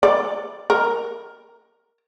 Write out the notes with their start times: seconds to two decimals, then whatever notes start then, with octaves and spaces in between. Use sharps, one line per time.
0.03 D5
0.70 A#4